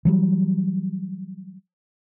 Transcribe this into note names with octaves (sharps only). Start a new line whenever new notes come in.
E3 F#3 G3